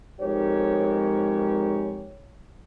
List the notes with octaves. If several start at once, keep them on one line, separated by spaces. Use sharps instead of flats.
F2 G#2 G#3 G4 A#4 C#5